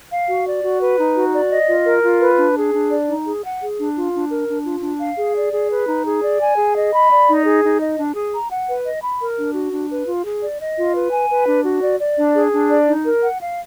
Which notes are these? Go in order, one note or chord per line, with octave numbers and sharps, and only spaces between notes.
F5
F#4
D5
F#4
B4
D#4
F#4
D5
D#5
F4
A#4
F4
B4
D4
G#4
D4
D5
D#4
G#4
F#5
G#4
D4
F4
D4
A#4
D4
F4
D4
F5
G#4
D5
G#4
B4
D#4
G#4
D5
G#5
G#4
D#5
B5
D5
D#4
G#4
D#4
D#5
D4
G#4
A#5
F#5
B4
D#5
B5
A#4
D4
F#4
D4
B4
F4
G#4
D5
D#5
F4
B4
G#5
B4
D4
F#4
D5
D5
D4
G#4
D4
D5
D#4
A#4
F#5
F5